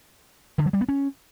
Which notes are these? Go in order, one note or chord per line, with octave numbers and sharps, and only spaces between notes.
D3
F#3
G3
B3
C#4